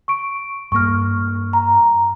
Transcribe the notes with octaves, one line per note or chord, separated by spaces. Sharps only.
C#6 D7
G2 A#3 C#6 F6
A#5